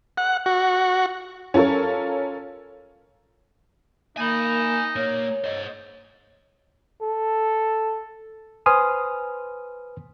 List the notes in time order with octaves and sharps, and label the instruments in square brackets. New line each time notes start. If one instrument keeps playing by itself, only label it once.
[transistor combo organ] F#5
F#4
[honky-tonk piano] C#4 F4 A4 A#4 C#5
[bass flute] A#3 [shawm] D#4 [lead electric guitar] G#5 B5
[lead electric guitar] A#2 A#3 [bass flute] C#5
[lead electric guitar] C5 D#5
[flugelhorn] A4
[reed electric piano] B4 C5 G#5 C6 D#6 F6